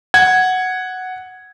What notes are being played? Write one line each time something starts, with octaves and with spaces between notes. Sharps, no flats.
F#5 G#6